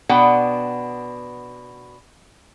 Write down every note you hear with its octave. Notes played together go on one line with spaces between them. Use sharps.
B2 B3 D4 F#5 G5